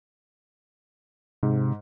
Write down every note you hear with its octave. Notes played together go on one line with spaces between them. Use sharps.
G#2 C3